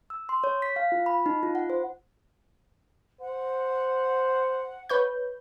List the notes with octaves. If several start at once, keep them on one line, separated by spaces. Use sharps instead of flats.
E6
C6
C#5
B6
F5
F4
B5
D#4
F4
F#5
C5
C5 F#5
B4 C#5 G6